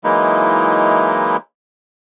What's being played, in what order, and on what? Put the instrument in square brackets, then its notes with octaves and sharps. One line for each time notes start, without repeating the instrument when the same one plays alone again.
[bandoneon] E3 F#3 G#3 A#3 D#4 E4